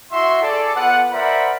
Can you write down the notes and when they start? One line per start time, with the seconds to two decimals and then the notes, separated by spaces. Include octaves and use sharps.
0.12 E4 F#4 E5 C6
0.41 G#4 A4 D5
0.76 B3 F4 B4 F#5
1.12 A#4 C5 D5 E5 F#5 B5